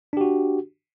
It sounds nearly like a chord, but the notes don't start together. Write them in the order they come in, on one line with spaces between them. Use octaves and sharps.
D4 G4 F#4